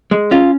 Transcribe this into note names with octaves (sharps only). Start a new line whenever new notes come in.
G#3
C#4 F4